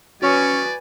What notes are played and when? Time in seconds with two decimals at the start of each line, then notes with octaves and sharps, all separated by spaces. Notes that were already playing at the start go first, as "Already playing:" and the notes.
0.22 C#4 F#4 B4 D5 G#5 C#6 D#6